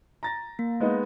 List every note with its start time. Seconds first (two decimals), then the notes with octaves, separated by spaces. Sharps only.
0.23 A#5 A6 A#6
0.59 A#3
0.80 G#3 B3 D#4